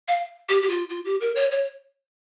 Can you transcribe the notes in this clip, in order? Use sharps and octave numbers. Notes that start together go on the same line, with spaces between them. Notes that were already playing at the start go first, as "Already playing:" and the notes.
F5
G4
G4
F4
F4
G4
A#4
C#5
C#5